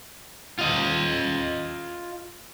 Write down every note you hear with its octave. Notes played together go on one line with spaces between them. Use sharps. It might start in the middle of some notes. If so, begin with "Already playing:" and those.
F4 D#5